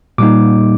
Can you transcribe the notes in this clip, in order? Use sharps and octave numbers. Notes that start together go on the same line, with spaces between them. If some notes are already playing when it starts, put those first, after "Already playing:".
A#2 G3 A#3 D#4 D6